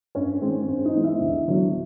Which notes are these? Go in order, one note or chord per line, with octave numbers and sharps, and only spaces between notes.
G2 C#4 C#5
D#3 G#3 C4
G2 C5
D#4 D#5
E3 G#3 B3
E4 E5
D2
D3 F#3 B3 D4